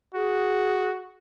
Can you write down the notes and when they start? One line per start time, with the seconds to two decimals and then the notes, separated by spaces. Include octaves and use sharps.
0.15 F#4 G#4